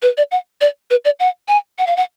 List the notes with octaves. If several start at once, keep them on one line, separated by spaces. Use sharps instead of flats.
B4
D5
F#5
D5
B4
D5
F#5
G#5
F#5
F5
F#5